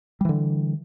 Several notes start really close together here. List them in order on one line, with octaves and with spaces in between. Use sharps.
G3 E3 D3